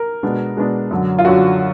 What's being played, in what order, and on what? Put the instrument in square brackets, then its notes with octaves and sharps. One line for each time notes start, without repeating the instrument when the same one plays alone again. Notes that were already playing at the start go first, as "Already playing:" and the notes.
Already playing: [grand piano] A#4
B2 G#3 B3 D4
B2 G#3 B3 D4
F#2 D3 F#3
F4
F#2 D3 F#3 F#4